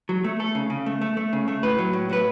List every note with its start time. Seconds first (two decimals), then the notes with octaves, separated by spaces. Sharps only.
0.09 F#3
0.24 A3
0.40 A3 A4
0.55 C#3
0.70 C#3
0.86 A3
1.01 A3
1.17 A3
1.33 C#3
1.48 A3
1.63 A2 B4
1.78 F#3
1.93 A2
2.09 F#3 B4